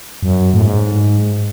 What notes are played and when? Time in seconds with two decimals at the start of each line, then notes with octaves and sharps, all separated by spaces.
0.23 F#2
0.54 A2
0.62 G#2